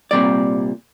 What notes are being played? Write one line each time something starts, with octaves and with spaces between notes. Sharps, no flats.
C2 A#2 G3 C4 D5